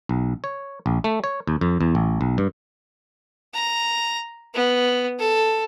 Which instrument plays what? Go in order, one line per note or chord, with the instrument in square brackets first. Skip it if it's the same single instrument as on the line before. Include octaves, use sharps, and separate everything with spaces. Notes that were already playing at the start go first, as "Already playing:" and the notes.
[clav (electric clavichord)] B1
C#5
A#1
A3
C#5
D#2
F2
E2
A1
B1
G2
[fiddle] A#5
B3
A4